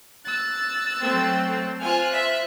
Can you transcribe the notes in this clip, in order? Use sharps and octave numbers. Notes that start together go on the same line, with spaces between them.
E6 F#6 A6
F#3 A3 C4
F4 C5 G#5 F6 F#6
E5